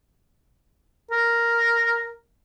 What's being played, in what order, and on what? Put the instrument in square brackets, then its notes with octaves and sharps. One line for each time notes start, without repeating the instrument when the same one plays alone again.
[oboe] A#4